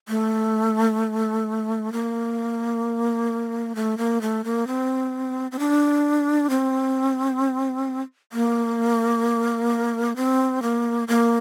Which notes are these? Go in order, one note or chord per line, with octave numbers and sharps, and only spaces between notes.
A3
A#3
A3
A#3
A3
A#3
C4
C4
D4
C4
A#3
C4
A#3
A#3